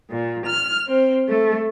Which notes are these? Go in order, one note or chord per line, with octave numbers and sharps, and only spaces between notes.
A#2
F6
C4
A3